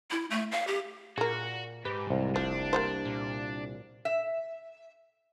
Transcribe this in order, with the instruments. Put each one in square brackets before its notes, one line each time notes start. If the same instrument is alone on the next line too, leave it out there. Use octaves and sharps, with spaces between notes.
[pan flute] E4
A3
F5
G4
[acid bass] A#2 [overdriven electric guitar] F#4 [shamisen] G#4 A#4
[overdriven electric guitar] G#2 [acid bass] G4 [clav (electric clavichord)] B4
[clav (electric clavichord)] C2
[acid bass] F1 [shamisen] F3 [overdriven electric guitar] D4
[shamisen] A#3 G4 C5
[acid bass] A#2
[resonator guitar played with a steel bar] E5